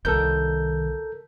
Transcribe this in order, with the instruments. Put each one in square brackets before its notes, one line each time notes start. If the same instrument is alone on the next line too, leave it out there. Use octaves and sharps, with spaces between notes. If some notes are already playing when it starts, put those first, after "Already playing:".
[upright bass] C2 D#3 [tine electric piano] A4 A#4 G6